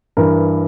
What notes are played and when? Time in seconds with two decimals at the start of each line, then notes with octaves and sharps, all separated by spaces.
0.17 G2 E3 A#4